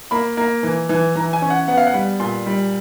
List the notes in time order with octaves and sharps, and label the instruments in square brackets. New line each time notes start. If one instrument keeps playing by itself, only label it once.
[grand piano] A#3 B5
A#3
E3
E3
E3 A#5
G#5
C#4
F#5
B3 F#5
F5
F#5
G3
A#2 C6
G3